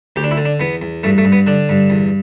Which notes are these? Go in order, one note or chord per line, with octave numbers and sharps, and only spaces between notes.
D2 G4
D4
E4
D3
D4
E2 B3
E2
G2 A3
A3
G2
B3
D3 D4
G2
E2